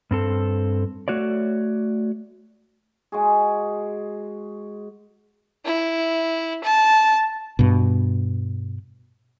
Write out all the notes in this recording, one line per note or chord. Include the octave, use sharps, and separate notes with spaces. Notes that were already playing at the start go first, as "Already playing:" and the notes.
G2 C4 A4
A3 F#4 C#5 D5
G#3 F#4 G#4
E4
A5
G2 B2